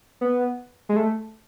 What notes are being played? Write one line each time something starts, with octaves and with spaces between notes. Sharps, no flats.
B3
G#3
A3